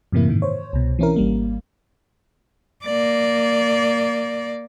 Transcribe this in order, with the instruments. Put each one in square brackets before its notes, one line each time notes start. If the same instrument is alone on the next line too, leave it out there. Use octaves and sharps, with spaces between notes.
[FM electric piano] F#2 A2 C3 E3 A#3 E4
G#2 D#3
C5 C#5
C2 B2
E3 C4 C#4 E4 A#4
G#1 G3 A#3
[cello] A#3 D5